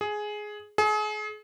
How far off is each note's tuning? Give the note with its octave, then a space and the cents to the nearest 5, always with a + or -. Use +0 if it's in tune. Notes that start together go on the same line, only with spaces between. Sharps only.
G#4 +10
G#4 +35